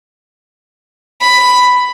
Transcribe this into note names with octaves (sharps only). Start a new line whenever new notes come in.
B5